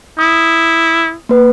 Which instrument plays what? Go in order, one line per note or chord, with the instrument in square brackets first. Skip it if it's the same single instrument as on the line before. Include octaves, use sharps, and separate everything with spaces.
[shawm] E4 [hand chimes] D#6
[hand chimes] A#3 B4